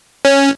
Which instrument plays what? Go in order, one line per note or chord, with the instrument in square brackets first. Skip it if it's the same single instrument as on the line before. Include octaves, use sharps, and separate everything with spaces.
[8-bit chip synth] C#4